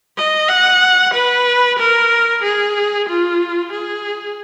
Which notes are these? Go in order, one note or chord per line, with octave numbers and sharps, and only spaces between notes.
D#5
F#5
B4
A#4
G#4
F4
G#4